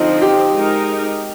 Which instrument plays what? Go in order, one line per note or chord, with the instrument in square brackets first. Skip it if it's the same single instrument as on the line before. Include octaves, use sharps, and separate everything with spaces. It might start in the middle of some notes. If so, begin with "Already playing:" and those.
Already playing: [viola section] D3 F3 C4 [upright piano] D#4
[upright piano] G4
[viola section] G#3 D#4 A#4